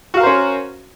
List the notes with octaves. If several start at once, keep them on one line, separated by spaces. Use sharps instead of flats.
C#4 F#4 A#4 C5 F5